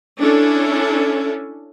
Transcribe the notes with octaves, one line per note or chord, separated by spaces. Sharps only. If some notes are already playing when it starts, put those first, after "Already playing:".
C#4 D4 E4 A4